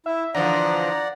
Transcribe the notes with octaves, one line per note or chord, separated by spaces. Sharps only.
E4 E5
D3 E3 F3 D5 F#5 A#5